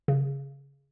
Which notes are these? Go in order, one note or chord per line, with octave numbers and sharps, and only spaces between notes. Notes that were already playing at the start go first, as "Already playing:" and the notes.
C#3